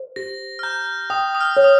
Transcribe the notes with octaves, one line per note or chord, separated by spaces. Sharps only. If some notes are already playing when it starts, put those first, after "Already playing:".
Already playing: C5
G4 A#6
F6
A#5 G6
G5 D#6
D#6
F6
C#5
D#6